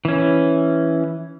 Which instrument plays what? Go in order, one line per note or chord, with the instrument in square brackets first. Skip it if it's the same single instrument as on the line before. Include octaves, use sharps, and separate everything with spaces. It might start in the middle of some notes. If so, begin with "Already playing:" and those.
[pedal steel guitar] E3 C#4